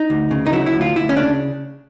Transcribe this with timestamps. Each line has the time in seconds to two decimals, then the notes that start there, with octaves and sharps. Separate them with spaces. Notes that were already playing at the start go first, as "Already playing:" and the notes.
Already playing: D#4
0.10 D2
0.31 C#3
0.47 D#4
0.52 F#3 E4
0.66 E4
0.73 D2
0.81 F4
0.95 D2 E4
1.09 C#4
1.16 C#3 D4